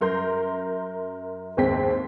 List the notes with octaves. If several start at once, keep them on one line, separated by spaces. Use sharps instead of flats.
F#2 A#4 C6 G6
F#1 D#2 G#2 C4 G5 B6